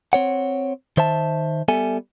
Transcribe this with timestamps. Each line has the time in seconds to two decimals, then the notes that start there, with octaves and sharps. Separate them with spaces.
0.13 C4 C#5 F#5
0.97 D#3 C5 E5 A5
1.68 G3 B3 A4 E5 G#5